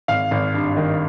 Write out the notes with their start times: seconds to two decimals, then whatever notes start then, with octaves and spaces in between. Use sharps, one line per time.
0.08 G#1 F5
0.31 G#1
0.54 G2
0.77 D#3